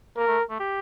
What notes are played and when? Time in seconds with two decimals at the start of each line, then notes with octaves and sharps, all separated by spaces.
0.17 A#3 A#4
0.28 A3
0.50 A3
0.60 G4